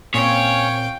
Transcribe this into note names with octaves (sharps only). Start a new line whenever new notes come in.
A#2 C4 C#4 C#5 F5 G5